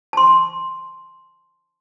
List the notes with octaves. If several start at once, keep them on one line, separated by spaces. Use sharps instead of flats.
A5 C6